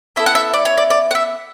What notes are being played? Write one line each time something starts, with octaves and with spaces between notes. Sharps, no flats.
B3 E4 A4 E5
F#5
E5
D5
C#5
D5
D5
F#5
E5